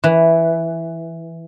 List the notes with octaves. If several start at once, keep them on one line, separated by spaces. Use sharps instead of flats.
E3